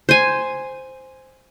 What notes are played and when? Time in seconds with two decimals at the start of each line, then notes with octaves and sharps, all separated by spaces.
0.09 C5 G#5